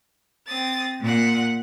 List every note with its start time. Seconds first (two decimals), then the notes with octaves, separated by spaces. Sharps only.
0.46 C4 D#6 A6
1.01 A#2 F#5